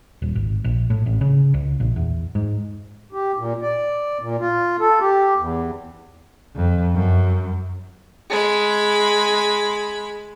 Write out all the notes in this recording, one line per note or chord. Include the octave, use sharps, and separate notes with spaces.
D#1
G#1
A#1
A2
A1
C#3
C#2
A#1
E2
G#2
G4
A#2
D5
A#2
F4
A4
G4
E2
F2
F#2
G#3 B5